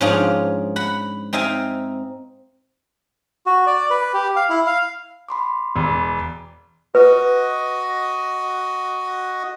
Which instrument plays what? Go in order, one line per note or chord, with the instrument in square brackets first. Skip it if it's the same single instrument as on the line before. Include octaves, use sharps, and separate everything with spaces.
[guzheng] G#2 F3 C#4 D4 F4 G#4
F#5 B5
C4 D#4 E5 F5 G#5
[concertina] F#4
D5
B4
G4
F5
E4
F5
[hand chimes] B5 C6 D6
[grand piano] E1
[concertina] F#4 D#5 [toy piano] B4